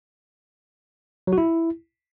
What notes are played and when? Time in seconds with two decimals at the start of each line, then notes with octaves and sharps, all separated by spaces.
1.27 F#3
1.33 F#4
1.38 E4